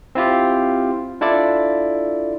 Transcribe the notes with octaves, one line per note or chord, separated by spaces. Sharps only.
C4 E4 F4 G4
D4 E4 F4 A4 D5